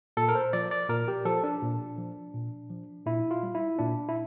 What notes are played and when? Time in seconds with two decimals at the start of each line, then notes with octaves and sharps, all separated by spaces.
0.17 A#2 A4
0.29 A#4
0.35 C5
0.53 F3 D5
0.71 D5
0.89 A#2 A#4
1.08 G4
1.25 F3 A4
1.44 D4
1.62 A#2
1.98 F3
2.34 A#2
2.70 F3
3.06 A#2 E4
3.31 F4
3.43 G3
3.55 E4
3.79 A#2 D4
4.09 E4